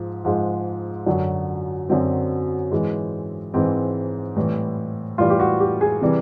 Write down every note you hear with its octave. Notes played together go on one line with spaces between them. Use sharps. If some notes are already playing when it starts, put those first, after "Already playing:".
Already playing: G#2 F3
G#2 F3 G#3
F#2 D3 F#3
F#2 D3 F#3 C4
G#2 E3 G#3
G#2 E3 G#3 C4
A2 E3 G3
A2 E3 G3 F4
G4
F#4
G4
G#4
C3 E3 G3